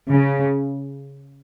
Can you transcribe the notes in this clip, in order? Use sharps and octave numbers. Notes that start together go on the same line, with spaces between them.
C#3